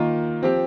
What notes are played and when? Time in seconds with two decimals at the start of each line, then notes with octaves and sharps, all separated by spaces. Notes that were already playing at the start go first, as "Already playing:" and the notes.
Already playing: D#3 A#3 F4
0.42 F3 C4 G4